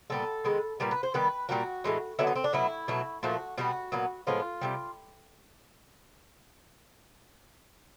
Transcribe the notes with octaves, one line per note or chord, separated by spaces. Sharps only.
A#2 G3 B3 A4
D#3 G#3 B3
A#2 G3 B3 A#4
B4
C5
D#3 G3 B3 B4
A#2 G3 A#3 F#4
A2 E3 G#3 B3
D3 F#3 B3 E4
D#4
C4
D4
B2 F#3 A3 E4
B2 F#3 A3
A#2 F3 A3 F#4
B2 G3 B3 F#4
A#2 F#3 B3
A2 F3 G#3 B3 F4
C3 D#3 G3